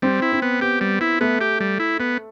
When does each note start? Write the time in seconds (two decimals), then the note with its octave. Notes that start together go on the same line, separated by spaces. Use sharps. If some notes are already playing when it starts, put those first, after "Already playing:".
0.02 G3 C4
0.22 E4
0.32 C4
0.42 B3
0.61 B3 G4
0.81 G3
1.01 E4
1.21 A3 B3
1.41 G4
1.60 G3
1.80 E4
2.00 B3